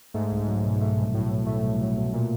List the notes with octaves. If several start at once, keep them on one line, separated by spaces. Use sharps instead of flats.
G#2 A3
C2
F#3
B2
A3
C2
A2 F#3
B2
A3
C2
F#3
B2
A#2 A3